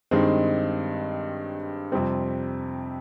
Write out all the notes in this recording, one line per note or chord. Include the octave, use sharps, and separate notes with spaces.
G2 D#3 G#3 C4 D#4
F2 C3 G3 C4